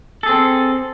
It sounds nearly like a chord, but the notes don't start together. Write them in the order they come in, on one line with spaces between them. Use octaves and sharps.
A4 G#4 C4